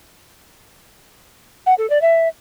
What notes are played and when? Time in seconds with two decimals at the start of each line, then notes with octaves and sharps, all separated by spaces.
1.66 F#5
1.78 A4
1.90 D5
2.02 E5